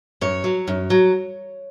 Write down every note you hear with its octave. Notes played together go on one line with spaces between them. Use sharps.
F#2 C#5
F#3
F#2
F#3